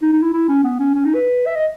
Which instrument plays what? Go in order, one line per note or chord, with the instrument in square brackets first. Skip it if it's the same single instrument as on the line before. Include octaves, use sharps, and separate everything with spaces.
[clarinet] D#4
D#4
E4
E4
C#4
B3
C#4
C#4
D#4
B4
E5
D#5